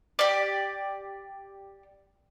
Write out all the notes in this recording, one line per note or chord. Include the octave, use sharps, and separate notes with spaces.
G4 D5